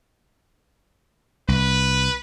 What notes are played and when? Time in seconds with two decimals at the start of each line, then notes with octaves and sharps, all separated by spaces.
1.48 C2 B4